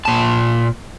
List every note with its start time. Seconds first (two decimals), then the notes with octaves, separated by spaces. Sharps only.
0.05 A#2 A5